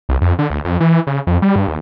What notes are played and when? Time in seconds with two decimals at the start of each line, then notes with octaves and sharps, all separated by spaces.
0.09 C2
0.21 F2
0.39 D3
0.50 D2
0.65 F2
0.80 E3
1.07 C#3
1.27 F2
1.42 G3
1.56 G2
1.68 D#2